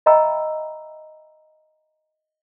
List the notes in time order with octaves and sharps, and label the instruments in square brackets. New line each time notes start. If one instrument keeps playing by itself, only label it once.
[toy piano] D#5 E5 G5 A#5 B5 E6